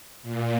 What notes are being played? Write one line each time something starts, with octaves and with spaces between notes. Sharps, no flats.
A#2